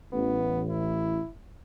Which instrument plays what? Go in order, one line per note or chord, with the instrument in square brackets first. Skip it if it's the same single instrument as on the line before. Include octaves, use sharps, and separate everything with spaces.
[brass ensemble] A1 [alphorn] B3
[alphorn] E4